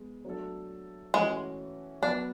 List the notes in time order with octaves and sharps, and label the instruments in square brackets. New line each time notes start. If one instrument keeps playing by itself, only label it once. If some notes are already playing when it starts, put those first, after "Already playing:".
Already playing: [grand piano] G#3 B3
F#3 A3 D4 A4
[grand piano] E3 A3 C#4 F#4 [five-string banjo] G#3
[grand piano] F#3 B3 F#4 B4 [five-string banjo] D4